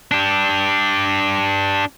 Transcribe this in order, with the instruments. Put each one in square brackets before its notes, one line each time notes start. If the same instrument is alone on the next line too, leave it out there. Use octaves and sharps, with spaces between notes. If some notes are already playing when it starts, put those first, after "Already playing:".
[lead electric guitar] D4 G4